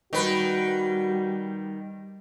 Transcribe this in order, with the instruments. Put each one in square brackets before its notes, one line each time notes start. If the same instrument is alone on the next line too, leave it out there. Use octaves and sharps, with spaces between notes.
[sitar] D#3 B4 [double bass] G3 [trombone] F#4